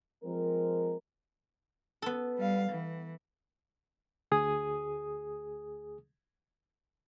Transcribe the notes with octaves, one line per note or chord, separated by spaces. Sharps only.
F3 G#3 C4 A#4
B3 A4
G3 F5
E3
D2 G#4 D#6